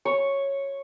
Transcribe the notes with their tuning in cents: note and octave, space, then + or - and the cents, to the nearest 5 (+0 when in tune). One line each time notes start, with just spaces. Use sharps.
C#5 -5